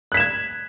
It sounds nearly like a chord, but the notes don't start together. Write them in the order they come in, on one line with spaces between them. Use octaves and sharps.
F#6 B6 E7 G#6